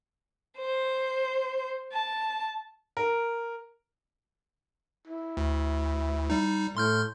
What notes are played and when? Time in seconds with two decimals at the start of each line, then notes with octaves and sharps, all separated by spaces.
0.58 C5
1.92 A5
2.97 A#4
5.07 E4
5.37 D2
6.30 G3 D#4
6.77 A2 C6 F6 G6